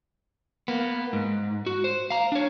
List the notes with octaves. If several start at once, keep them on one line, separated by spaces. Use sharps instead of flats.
A#3 B3
G#2
F#4
C5
F5 A#5
D4 C#5